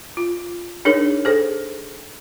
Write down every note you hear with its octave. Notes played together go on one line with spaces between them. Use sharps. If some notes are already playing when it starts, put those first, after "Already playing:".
F4
D4 D#4 G#4 A#4 C#5
G#4 A4 C5